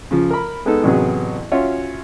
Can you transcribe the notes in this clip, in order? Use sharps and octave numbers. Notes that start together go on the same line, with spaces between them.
C#3 F3
A#4 B5
G#3 B3 D#4 A4
A1 C3 F#3 B3 G#4
C#4 F4 F#4 C#5 E5